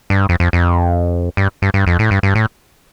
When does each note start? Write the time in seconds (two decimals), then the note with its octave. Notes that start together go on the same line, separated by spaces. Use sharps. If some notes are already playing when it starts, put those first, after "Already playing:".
0.10 G2
0.29 F2
0.40 F2
0.53 F2
1.37 G2
1.62 G2
1.74 G2
1.87 F2
1.99 A2
2.11 G2
2.23 G2
2.35 A2